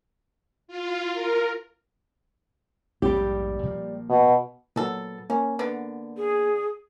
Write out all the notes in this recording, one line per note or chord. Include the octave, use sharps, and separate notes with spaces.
F4
A#4
A#1 E2 G#2 G3 G4
A#2 F3 A#3
B2
A#2 F#3 B3 A4
A#3 C#4
D3 B3
G#4